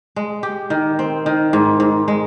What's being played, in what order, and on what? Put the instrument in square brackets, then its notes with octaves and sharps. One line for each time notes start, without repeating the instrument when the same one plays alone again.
[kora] G#3
G4
D#3
C4
D#3
G#2
G#2
G#3